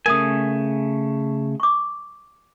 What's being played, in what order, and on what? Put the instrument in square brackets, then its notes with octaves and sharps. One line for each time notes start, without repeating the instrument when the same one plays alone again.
[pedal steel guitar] C#3 A3 G#5 [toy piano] A#4 D#6
[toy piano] C#6 D6